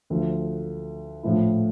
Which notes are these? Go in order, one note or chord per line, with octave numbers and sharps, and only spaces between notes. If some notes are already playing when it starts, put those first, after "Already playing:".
D2 D3 F3
A#1 A2 F3 A3 E4